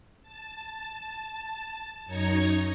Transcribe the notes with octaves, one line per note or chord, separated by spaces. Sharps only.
A5
F#2 D#4 C#5 A#5 C#6 G#6